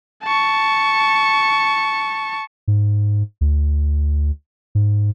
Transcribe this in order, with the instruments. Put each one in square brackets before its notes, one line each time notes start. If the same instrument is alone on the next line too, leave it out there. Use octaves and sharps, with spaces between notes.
[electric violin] A5 C#6
[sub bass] G#2
D2
G#2